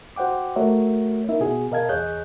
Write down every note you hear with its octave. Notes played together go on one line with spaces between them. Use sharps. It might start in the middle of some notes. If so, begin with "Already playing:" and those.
F#4 C5 F#5 G5 D6
A3 F#4 A#4 C#5 E5
A#3 D#4 E4 A#4 E5
B2 B3 F#4 G#4
B2 A#4 D#5 F5 A5 G#6
E2 G#4 C#5 D#5 F#6 G6